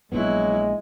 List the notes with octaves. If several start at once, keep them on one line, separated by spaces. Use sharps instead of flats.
A#1 F#3 G#3 B3 E4